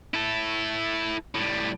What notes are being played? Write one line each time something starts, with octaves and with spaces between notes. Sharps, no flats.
E4 A4
A2 G3